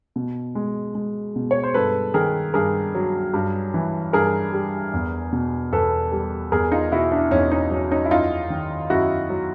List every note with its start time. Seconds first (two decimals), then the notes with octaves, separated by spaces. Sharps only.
0.16 B2
0.55 G#3
0.95 G#3
1.36 B2
1.51 C#5
1.64 C5
1.74 G2 A4 B4
2.14 D#3 G#4 A#4
2.54 G2 G#4 A#4
2.95 F#3
3.34 G2
3.74 E3
4.13 G2 G#4 A#4
4.53 G3
4.93 E2
5.33 B2
5.72 E2 A4 B4
6.12 G3
6.52 E2 G#4 A#4
6.72 D#4 F4
6.92 B2 E4 F#4
7.12 D4 E4
7.31 E2 C#4 D#4
7.51 C#4 D#4
7.71 F#3 C#4
7.91 C#4 D#4
8.05 E4
8.11 F#2 D#4 F4
8.50 D#3
8.90 F#2 E4 F#4
9.30 F#3